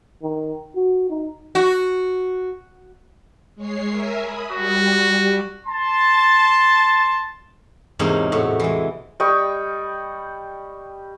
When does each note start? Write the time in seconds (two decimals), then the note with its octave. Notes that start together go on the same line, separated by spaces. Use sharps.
0.22 D#3
0.75 F#4
1.09 D#4
1.55 F#4
3.55 G#3 C#5 C7
3.90 A#4 E5 G#5
4.22 B5 D#6
4.52 G3 F#4 G4
5.67 A5 C6
7.99 E2 G#2 C3 A#3 C#4 D#4
8.32 A2 C3 F#4
8.60 E3 G#3
9.20 G3 D#5 G5 C#6